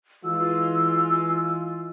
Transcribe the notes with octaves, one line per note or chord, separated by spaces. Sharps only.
E3 G#3 F4 E6